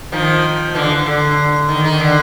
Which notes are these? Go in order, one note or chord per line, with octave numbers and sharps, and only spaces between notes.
D#3 F3
D3 E3
D3
D#3
D#3
D3